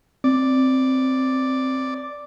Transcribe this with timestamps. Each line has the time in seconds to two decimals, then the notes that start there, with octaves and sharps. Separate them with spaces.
0.24 C4 D5